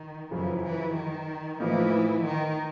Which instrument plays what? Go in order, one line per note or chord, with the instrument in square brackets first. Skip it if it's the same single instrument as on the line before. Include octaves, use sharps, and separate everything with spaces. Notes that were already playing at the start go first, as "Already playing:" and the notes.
Already playing: [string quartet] D#3
[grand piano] F#2 C#3 F3 [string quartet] E3
[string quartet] E3
D#3
[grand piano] A2 F3 A#3 D#4 [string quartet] E3
[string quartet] D#3